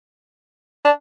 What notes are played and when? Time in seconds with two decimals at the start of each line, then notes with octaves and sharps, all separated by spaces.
0.84 D4